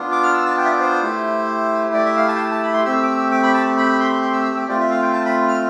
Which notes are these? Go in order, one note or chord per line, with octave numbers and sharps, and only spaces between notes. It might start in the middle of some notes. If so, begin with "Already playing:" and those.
Already playing: B3 D4 F4
D6
F6
E6
A5
G5
E5
D5
C5
A3 E4 G4
D5
E5
F5
A5
G5
A5
A5
B5
C6
A3 C4 G4 E6
D6
E6
D6
B5
A5
B5
C6
C6
E6
E6
G5
A3 C4 F4 D5
E5
F5
G5
A5
B5
F6